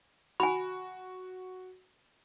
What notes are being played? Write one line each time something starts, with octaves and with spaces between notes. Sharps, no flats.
F#4 G#5 B5